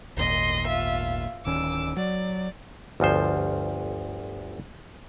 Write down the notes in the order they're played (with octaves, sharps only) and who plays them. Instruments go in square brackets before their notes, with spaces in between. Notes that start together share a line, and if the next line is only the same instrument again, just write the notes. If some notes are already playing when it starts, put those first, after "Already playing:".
[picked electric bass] G#1 D#2 A#2 [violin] D#5 C6
[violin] F4 E5
[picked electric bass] D1 D#3 C#4 [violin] D6 E6
[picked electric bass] F#3 [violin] D5
[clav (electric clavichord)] G1 D2 F3 C5